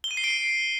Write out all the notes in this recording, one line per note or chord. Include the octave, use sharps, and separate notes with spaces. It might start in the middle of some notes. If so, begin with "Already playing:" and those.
G7
D#7
C7
D7